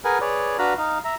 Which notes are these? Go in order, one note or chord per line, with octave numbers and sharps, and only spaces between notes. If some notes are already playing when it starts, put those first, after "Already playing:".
G#4 A#4 B4 F#5 G#5
G#4 B4 C#5 D5
D4 F#4 B4 F5 A#5 B5
D#4 F5
E5 A#5